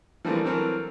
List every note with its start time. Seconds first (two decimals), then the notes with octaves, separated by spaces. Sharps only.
0.25 E3 F3 G3 A3 A#3 C4
0.44 E3 F#3 C4 A4 A#4